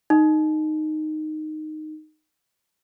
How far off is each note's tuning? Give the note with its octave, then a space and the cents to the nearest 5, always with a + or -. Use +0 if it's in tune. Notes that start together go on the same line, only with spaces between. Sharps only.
D#4 -10